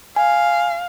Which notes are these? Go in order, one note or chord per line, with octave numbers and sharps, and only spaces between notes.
F5 G#5